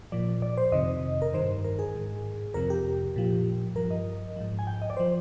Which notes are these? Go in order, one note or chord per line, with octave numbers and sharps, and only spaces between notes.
A#2 F3 D5
D5
C5
F2 C3 D#3 D#5
A#4
G2 D#3 C5
A#4
G#4
G#2 D#3
F2 C3 F3 A#4
G4
A#2 F3
G2 F3 A#4
D#5
G#2 F3
G#5
G5
D#5
D5
F3 C5